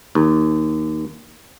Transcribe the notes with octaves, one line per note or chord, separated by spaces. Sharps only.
D#2